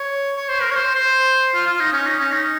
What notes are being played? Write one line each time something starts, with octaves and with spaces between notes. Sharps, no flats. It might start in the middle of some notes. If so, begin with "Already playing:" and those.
Already playing: C#5
C#5
C5
A#4
C#5
C5
C5
F4
F4
D#4
C#4
D#4
C#4
D#4